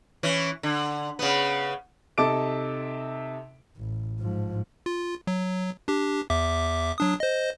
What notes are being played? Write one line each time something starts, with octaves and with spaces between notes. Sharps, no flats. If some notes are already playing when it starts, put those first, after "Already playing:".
E3 C#4
D3
C#3 B3
C3 D#4 A4 A5 D6 D7
A1
G#2 F3
F4
F#3
D4 G4
E2 E5 D6
F#3 D4 D#6
C5 D#5